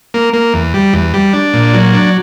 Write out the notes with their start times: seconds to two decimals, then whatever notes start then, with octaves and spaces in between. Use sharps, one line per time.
0.14 A#3
0.33 A#3
0.54 E2
0.74 G3
0.93 E2
1.14 G3
1.33 D4
1.53 A#2
1.74 F#3
1.94 D4